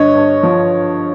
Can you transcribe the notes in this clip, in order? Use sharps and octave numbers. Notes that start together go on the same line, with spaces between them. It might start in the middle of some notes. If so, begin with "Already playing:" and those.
Already playing: G2 D3 C#5 D#5
G2
F3